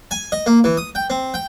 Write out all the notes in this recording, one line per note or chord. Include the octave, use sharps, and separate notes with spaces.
G#5
D#5
A#3
E3
D#6
G5
C4
G5